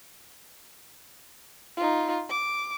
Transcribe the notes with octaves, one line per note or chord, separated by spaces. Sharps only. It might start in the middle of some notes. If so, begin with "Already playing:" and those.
D#4 F4
D6